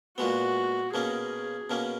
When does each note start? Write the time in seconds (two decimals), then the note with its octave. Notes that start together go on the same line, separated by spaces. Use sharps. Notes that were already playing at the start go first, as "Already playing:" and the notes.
0.18 A#2 G#3 B3 F#4
0.94 B2 A#3 C#4 G#4
1.70 B2 A#3 C#4